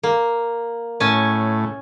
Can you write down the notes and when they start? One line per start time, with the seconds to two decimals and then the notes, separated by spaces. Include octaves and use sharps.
0.03 A#3
1.00 A2 C#4 G#5 A5